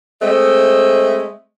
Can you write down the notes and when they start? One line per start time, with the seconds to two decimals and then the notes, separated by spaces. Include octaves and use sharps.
0.21 G#3 A3 C4 D#5 E5